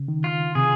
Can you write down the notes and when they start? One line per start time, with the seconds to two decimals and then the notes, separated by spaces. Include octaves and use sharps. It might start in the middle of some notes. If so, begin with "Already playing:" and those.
Already playing: C#3
0.08 D#3
0.24 F4
0.55 C3 G#4